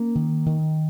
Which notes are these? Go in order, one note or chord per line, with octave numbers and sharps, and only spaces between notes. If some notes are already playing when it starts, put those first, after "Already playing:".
Already playing: A#3 C#4
D#3
D#3